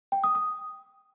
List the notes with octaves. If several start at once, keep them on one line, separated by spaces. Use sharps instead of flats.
G5
D#6
D#6